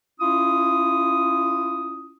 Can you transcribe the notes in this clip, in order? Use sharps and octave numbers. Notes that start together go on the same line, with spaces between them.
C#4 E4 F4 D#6